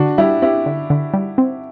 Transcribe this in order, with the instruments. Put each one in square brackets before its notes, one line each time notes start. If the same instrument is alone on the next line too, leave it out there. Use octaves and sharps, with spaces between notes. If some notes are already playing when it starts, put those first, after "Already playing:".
Already playing: [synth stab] D3 [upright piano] D4 F#4
[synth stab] G3 [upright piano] E4 G4
[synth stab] C4 [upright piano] E4 G4
[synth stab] D3
D3
G3
C4